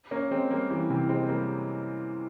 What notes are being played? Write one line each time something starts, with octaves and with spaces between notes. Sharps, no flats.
A#3 C#4
G#3 C4
G3 A#3
E3 G3
C3 E3
G#3 C4
G3 A#3